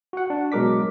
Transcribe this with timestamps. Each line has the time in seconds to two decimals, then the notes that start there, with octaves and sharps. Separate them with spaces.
0.13 F#4 F#5
0.30 D4
0.52 B2 F#3 G#3 A#4 D6 B6